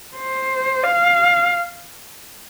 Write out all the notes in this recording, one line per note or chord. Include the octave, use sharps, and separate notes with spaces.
C5
F5